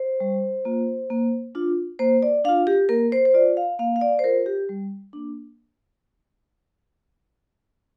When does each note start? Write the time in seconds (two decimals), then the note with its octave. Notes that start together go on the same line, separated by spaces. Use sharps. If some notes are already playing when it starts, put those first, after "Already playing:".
Already playing: C5
0.20 G3
0.65 A#3 F4
1.10 A#3
1.55 D4 F4
1.99 A#3 C5
2.23 D5
2.44 D4 F4 F5
2.67 G4
2.89 A#3 A#4
3.12 C5
3.25 C5
3.34 F4 D5
3.57 F5
3.79 A#3 F5
3.96 F5
4.01 D5
4.19 C5
4.24 F4 A#4
4.46 G4
4.69 G3
5.13 A#3 D4